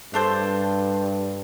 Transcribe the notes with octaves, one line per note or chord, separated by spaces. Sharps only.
G2 D4 A4 C5